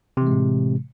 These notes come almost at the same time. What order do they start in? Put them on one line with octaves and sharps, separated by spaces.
C3 E3 G#3 A2